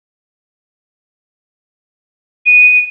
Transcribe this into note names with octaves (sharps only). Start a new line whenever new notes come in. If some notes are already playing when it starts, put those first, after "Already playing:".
D#7